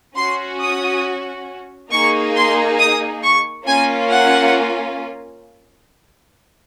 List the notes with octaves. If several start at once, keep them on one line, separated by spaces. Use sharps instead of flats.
C#4 F#4 C6
D#6
A#3 D#4 G#4 C#6
C6
D#6
C#6
A#3 C#4 F4 G#5
F#5